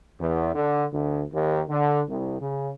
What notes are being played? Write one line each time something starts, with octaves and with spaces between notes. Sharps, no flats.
E2
D3
D2
D#2
D3
C2
C#3